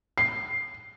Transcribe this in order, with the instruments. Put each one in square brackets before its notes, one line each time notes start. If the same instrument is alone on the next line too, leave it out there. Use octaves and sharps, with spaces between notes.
[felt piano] C7